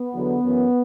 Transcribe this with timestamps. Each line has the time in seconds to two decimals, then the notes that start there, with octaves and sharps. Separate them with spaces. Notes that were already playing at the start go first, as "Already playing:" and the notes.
Already playing: B3
0.13 E2 D3 F#3
0.42 F#2 E3